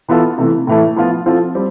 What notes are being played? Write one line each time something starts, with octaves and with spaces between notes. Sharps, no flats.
E3 B3 F4 A4
C3 E3 A3
A2 E3 A3
F3 B3 F4
F3 C4 F4 A4
G3 C4 G4